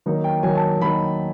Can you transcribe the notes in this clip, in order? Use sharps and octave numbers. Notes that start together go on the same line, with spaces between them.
D#3 F#3 A#3 D#4
G5
D#3 F#3 A#3 D#4 G#5
A5
D#3 F#3 A#3 D#4 B5